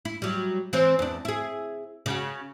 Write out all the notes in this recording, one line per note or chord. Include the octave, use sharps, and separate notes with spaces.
E4
F#3 G3
E3 C4 C5
E2 D4
E4 G#4
C#3 F#4